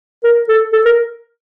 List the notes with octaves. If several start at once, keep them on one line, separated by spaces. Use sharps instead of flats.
A#4
A4
A4
A#4